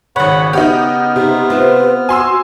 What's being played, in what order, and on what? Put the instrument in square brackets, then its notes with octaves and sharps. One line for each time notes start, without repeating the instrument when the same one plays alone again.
[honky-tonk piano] G#1 C#5 [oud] C#3 [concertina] F#5 B5
[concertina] B3 F6 [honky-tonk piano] D#4 F#4 G4
[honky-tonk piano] C3 [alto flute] D#4
[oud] C4 F4 E5 [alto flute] B4
[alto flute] F#4 [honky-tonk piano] G#5 C6 E6